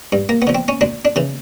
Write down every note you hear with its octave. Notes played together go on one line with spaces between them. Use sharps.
G2
A#3
B3
D3 F3
C4
C#4
D2 D4
D4
C#3 E3